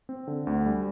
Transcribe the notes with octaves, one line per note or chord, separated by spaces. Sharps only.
C4
D3
D2
G3